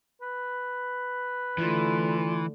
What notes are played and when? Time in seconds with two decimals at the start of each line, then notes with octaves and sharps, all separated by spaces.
0.22 B4
1.58 D3 E3 A3 F4